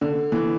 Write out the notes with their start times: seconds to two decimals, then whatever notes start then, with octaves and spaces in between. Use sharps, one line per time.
0.01 D3
0.32 E3